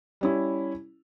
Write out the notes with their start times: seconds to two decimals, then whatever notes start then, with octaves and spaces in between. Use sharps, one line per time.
0.21 G3 C#4 E4